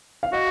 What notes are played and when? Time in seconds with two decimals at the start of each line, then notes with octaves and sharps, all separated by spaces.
0.23 F5
0.33 F#4 D#5